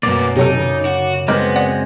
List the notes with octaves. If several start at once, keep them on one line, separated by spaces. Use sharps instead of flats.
F#2 B2 A#3 B3 D5
C3 F#3 D#4 A4
C#3
F#4
G#3 B3 C4 D#4 A#4 D6 A6
D5 F#5